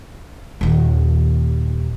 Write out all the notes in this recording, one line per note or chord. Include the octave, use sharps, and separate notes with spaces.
D#1 D#2